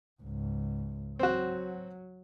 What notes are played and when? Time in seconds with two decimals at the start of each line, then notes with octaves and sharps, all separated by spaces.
0.22 C#2 G#2
1.19 F#3 C4 F#4